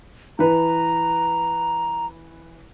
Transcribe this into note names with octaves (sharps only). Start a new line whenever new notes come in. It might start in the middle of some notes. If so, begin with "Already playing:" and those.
E3 B4 A#5